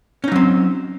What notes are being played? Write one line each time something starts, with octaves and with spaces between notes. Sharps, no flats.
F#3 C4 C#4 D#4